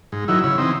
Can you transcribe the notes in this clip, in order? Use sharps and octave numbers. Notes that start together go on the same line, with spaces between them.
G#2
D#3 F#3 E4
C#3 E4
E3 C4 D#4